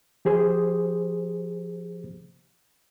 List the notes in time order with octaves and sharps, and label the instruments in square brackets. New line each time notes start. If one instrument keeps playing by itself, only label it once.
[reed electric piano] F3 G4 G#4 C5